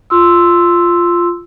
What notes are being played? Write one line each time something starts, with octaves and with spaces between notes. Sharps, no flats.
F4 C6 E6